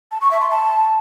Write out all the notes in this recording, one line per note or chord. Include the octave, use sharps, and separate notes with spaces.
A5
C#6
E5
C6
A5